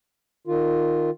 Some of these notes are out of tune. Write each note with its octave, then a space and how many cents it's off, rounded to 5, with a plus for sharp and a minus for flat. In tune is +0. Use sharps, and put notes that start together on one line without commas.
D#3 -10 F4 +0